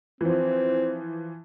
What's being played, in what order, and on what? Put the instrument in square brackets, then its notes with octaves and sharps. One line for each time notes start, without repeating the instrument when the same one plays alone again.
[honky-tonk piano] E3 F3 [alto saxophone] C4